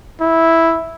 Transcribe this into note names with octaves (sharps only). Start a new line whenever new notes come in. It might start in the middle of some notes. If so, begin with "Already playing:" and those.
E4